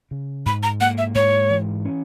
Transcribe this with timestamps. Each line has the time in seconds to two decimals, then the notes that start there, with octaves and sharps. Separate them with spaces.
0.11 C#3
0.46 G#2 B5
0.63 A#5
0.81 A#3 F#5
0.98 E5
1.15 G#2 C#5
1.50 E3
1.85 C#4